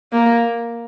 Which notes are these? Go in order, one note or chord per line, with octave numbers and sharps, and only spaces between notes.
A#3